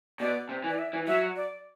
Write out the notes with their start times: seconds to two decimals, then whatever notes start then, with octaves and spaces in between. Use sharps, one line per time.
0.20 B2 D5
0.49 C3
0.64 E3
0.70 D5
0.79 E5
0.93 E3
1.07 F#3 E5
1.36 D5